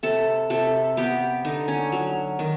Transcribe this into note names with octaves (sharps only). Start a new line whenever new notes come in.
C3 A4
C3 A4
B3 G4
D3 D#4
C#4
F#3
D#3